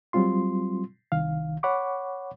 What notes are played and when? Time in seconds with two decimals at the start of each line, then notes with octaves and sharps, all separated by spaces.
0.13 F#3 G3 C4 F4 C6
1.12 C2 D#3 F5
1.63 C#5 F#5 B5 C#6 D6